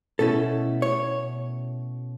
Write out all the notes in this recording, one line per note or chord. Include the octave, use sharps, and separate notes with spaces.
B2 A3 C#4 E4 A4
C#5